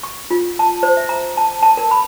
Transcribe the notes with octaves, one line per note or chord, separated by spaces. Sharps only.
C#6
F4
A5
C5
E5
A#5
A5
A5
A#4
B5